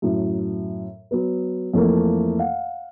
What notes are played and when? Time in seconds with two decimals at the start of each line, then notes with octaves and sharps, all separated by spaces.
0.02 F#2 A2
1.11 F#3 B3
1.74 F2 E3 A3 A#3
2.39 F5 F#5